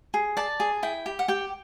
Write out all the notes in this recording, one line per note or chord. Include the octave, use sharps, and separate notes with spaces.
G#4
D5 A5
G#4
E4 G5
G4
F#5
G4 G5